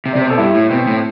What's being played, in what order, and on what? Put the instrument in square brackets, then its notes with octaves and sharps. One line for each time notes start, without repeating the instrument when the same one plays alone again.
[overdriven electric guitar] C3
[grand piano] D5
[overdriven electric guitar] C3
[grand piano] C5
[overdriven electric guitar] B2
[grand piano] A4
[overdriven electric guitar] G2 [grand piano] E4
[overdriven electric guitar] A2
[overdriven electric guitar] B2 [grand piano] C4
[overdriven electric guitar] A2